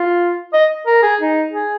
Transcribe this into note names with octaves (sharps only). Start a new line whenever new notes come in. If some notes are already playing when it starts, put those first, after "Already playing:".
Already playing: F4
D#5
A#4
G#4
D#4
G#4